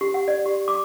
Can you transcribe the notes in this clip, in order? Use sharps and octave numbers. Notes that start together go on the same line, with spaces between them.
G4
F#5
D5
G4
D6